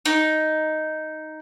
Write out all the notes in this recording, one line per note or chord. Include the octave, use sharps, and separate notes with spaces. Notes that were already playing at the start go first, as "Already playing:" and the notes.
D#4